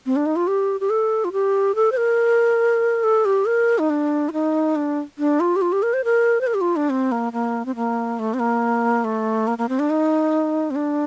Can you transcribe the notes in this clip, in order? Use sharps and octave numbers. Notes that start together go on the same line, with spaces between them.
C4
D4
D#4
F4
G4
G4
A4
F4
G4
A4
C5
A#4
A4
G4
A#4
D#4
D4
F4
D#4
D4
D4
F4
G4
F4
G4
A#4
C5
A#4
C5
A#4
G4
F4
D4
C4
A#3
A#3
C4
A#3
A3
C4
A#3
A3
A#3
A#3
C4
D4
D#4
C4
D4